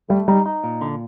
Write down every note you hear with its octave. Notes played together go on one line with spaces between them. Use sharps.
G3 A3
G3 D#4
D#4
A#2
D3